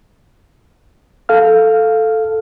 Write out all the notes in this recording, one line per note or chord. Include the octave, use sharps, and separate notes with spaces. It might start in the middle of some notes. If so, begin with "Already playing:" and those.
A4 F5 F6